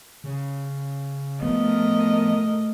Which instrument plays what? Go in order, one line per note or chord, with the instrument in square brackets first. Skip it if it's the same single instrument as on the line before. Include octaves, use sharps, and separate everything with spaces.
[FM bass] C#3
[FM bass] F3 [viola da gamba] A3 A#4 D#5 [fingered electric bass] B3